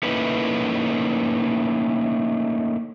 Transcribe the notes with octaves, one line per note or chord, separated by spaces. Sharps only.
A3 A#3 C#4 D#4 E4 B4